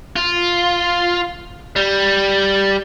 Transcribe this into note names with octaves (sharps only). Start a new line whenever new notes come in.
F4
G3